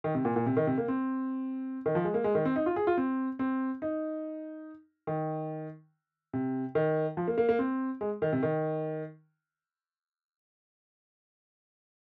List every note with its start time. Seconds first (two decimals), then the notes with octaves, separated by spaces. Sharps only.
0.04 D#3
0.15 C3
0.25 A#2
0.36 A#2
0.46 C3
0.57 D#3
0.67 C3
0.78 A#3
0.88 C4
1.86 D#3
1.95 F3
2.04 G#3
2.14 A#3
2.24 G#3
2.35 D#3
2.45 C4
2.56 D#4
2.66 F4
2.76 G#4
2.87 F4
2.97 C4
3.39 C4
3.82 D#4
5.07 D#3
6.33 C3
6.75 D#3
7.17 F3
7.28 A#3
7.38 A#3
7.49 A#3
7.59 C4
8.01 G#3
8.22 D#3
8.33 C3
8.43 D#3